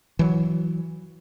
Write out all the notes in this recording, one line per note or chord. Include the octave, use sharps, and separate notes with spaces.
E3 F#3